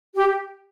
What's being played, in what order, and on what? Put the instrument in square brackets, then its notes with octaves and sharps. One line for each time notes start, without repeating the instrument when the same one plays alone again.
[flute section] G4